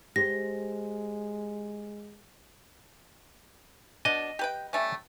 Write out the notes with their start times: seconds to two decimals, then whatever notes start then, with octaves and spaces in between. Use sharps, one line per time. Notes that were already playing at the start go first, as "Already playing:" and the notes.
0.16 G#3 G4 C5 A#6
4.05 B2 D4 D#5
4.39 G4 B4 G5
4.73 G3 A3 C#4